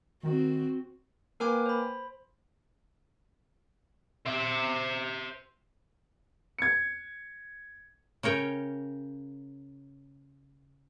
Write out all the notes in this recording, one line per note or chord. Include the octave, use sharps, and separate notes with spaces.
D#3 C4 F#4
A#3 A#4 B4 G5 G#5 D6
C5 B5
C5 E5
G#6 C#7
C#3 A#4 C#5 G5